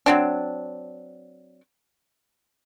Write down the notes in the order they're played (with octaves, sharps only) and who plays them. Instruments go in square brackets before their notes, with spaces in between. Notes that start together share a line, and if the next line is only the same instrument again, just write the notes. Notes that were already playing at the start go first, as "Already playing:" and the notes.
[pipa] F#3 C4 D4